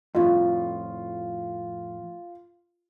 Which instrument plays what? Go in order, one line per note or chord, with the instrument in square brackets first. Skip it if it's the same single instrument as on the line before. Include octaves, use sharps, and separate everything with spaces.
[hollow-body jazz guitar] F2 A2 [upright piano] F4